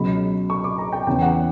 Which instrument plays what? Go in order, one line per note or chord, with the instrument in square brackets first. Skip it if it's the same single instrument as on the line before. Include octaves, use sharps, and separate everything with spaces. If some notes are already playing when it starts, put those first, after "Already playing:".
Already playing: [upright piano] C#2 B2 F#3 B5
C#6
D6
A#5
G5
E2 C#3 E3 G5
F#5